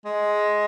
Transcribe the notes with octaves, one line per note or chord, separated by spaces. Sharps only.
G#3